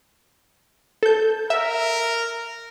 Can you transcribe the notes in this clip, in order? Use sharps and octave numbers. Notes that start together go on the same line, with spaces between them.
A4 G6
A#4 E5